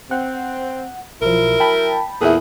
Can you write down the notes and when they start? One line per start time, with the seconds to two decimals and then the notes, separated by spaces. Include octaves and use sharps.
0.11 C4 F#5
1.22 B1 F3 F#3 E4 A#4
1.60 G5 A5 B5
2.21 E2 A#2 E4 G#4 A4